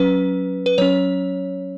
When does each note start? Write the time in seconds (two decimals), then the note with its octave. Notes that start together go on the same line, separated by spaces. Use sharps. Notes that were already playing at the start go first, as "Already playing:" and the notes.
Already playing: F#3 C#4 B4
0.66 B4
0.78 F#3 C#4 C#5